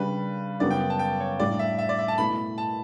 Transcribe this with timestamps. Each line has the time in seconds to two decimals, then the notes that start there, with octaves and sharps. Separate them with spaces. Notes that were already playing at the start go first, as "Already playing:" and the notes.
Already playing: C#3 G3 D4 B4
0.60 F#2 C#3 G3 B3 F#4 D5
0.71 G5
0.90 A5
0.99 G5
1.20 C#5
1.39 A2 G3 D4 D5
1.59 E5
1.79 E5
1.89 D5
1.98 E5
2.08 A5
2.18 B2 A3 E4 B5
2.58 A5